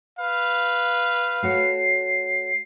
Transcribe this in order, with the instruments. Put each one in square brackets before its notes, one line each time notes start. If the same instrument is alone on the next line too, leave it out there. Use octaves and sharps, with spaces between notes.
[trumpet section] B4 F5
[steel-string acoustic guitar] A3 F#4 C#5 [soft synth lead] C7